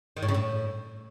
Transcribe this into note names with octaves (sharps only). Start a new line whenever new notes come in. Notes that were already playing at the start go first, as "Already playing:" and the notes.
D#3
A2
C#3
A2